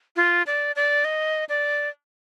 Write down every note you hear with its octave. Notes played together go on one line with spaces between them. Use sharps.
F4
D5
D5
D#5
D5